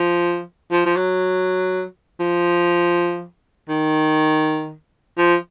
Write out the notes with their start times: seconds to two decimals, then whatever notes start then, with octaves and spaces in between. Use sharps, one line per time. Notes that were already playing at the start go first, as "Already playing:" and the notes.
Already playing: F3
0.71 F3
0.86 F3
0.96 F#3
2.20 F3
3.69 D#3
5.18 F3